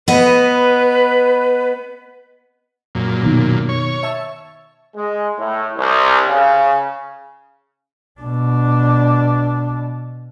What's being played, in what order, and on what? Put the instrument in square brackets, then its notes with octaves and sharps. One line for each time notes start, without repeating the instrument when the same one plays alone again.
[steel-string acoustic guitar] B3 D#5 [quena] B4
[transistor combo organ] F#2 A#2
[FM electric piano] B2 D#3
[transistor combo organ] C#5
[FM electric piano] E5 A5 E6
[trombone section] G#3
A2
C2
C#3
[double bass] B2 D4